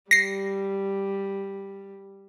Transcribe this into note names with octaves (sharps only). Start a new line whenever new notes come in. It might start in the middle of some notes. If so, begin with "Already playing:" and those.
G3 A#6 C7